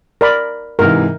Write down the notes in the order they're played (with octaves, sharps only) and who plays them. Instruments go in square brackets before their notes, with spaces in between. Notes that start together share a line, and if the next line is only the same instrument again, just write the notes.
[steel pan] A#4 D5 B5
[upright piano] G#2 C3 E3 [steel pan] A#4